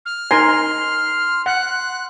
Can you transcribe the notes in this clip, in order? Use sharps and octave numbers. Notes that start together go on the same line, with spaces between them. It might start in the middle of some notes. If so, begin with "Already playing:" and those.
F6
D#4 A#4 G#5 C6
F#5 F#6